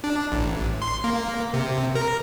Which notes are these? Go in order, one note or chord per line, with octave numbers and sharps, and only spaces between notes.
D4
A1
C6
A#3
C3
A#4